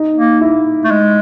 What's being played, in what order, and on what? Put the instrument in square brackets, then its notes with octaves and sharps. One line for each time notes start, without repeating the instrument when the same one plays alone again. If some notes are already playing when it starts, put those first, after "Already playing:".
Already playing: [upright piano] D#4
[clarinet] A#3
[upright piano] E4
[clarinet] A3
G#3